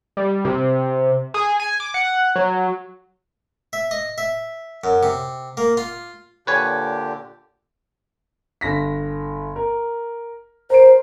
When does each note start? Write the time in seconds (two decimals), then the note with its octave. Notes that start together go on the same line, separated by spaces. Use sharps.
0.17 G3
0.45 C3
1.34 G#4
1.60 G#5
1.80 D6
1.94 F#5
2.36 F#3
3.73 E5
3.91 D#5
4.18 E5
4.84 F#2
5.03 C3
5.57 A#3
5.77 F4
6.47 A#2 D3 G4 B4 C#5 G#5
8.61 G1 A#6 B6
9.56 A#4
10.70 A#4 C5 D7